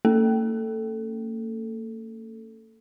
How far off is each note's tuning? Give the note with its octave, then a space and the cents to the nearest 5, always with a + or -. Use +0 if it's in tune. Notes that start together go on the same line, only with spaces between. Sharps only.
A#3 -45 C#4 +10 A4 +0